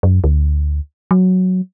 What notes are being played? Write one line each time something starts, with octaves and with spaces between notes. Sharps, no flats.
F#2
D2
F#3